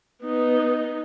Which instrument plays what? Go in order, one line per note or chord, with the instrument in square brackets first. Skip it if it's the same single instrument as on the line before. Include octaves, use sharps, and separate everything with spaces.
[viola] B3 D#4